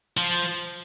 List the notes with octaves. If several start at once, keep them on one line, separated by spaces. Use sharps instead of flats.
F3